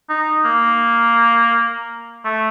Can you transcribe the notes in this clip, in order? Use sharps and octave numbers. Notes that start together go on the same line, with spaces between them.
D#4
A#3
A3